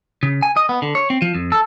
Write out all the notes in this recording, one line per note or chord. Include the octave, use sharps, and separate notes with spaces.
C#3
G#5
D#5
B3
D3
C#5
C4
F3
F2
A4